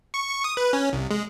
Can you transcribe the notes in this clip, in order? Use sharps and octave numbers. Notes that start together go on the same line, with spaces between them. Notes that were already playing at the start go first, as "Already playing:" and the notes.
C#6
C#6
D#6
B4
C#4
C2
G#3